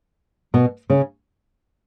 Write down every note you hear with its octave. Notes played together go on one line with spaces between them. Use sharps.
B2 B3
C#3 C#4